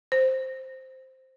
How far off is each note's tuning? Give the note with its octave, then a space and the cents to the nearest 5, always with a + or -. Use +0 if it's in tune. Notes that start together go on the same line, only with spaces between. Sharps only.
C5 +0